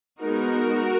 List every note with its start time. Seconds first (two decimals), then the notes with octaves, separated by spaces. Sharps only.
0.19 G#3 B3 D#4 F#4 A#4